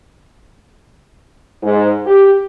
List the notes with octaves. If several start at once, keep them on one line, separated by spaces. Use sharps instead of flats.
G#2
G4